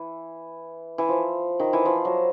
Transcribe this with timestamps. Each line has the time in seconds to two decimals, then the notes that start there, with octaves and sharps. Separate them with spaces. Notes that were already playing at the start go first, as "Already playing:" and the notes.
Already playing: E3
0.98 E3
1.09 F3
1.60 D#3
1.73 E3
1.85 F3
2.05 F#3